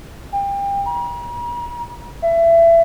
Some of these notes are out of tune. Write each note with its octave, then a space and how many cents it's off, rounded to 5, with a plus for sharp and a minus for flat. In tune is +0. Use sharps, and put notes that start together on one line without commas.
G5 +30
A#5 +45
E5 +25